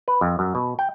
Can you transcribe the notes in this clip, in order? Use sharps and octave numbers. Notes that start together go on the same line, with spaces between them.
B4
F2
F#2
B2
G5